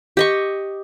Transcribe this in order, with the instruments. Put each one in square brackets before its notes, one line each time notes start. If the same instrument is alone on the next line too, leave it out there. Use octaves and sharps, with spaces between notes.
[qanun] G4 D#5 C#6